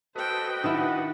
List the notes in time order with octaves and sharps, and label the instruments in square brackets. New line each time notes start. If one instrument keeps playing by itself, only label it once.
[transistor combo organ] F#4 B4 D#5 [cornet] A4 [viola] C5 G5
[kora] D#3 E4 [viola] D4 [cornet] F#5